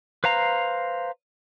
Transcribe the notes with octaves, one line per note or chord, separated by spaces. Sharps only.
B4 C5 F5 A#5